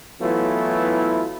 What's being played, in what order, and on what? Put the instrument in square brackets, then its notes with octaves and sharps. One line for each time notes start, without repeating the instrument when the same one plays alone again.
[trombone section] E3 F#3 A3 B3 E4 F4